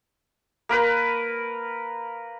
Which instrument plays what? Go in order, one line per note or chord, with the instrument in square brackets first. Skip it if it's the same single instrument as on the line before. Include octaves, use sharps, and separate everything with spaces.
[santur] A#3 A#4 B4